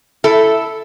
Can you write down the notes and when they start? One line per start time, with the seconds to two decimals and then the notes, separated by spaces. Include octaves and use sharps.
0.24 E4 A4